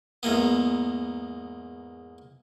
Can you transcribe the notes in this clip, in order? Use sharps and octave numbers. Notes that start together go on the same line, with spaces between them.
E2 G#2 A#3 B3